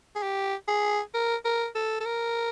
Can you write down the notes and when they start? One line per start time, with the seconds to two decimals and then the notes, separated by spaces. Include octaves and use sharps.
0.16 G#4
0.23 G4
0.68 G#4
1.14 A#4
1.45 A#4
1.75 A4
2.00 A4
2.05 A#4